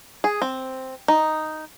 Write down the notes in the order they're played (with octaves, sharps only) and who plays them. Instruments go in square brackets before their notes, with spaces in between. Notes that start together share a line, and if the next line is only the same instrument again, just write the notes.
[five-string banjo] G#4
C4
D#4